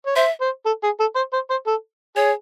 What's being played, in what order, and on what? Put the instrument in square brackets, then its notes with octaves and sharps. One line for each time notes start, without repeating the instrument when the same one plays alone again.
[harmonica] C#5
[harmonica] C5 [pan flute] E5
[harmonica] C5
A4
G#4
A4
C5
C5
C5
A4
[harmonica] G#4 [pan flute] C#5